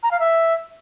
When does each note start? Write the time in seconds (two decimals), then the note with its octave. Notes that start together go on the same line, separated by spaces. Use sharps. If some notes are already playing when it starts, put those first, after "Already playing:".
0.03 A#5
0.11 F5
0.20 E5